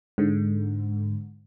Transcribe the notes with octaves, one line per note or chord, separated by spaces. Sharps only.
G#2 D3